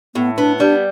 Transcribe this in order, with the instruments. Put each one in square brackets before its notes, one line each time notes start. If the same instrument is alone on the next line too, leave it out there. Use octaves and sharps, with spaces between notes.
[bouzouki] A2 [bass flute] B3
[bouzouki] B3 [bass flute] D4
[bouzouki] G3 [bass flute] D4